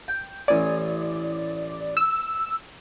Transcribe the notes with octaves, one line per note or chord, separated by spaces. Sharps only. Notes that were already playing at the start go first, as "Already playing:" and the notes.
G5
A1 D5 G#5
E6